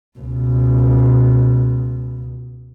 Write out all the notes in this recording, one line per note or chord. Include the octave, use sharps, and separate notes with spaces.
C#2 B2